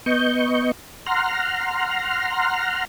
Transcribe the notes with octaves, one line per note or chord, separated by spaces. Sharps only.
B3 D#5 C#6 G6
F#5 A#5 C6 F6